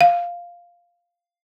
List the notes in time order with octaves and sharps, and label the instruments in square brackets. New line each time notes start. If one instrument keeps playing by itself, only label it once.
[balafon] F5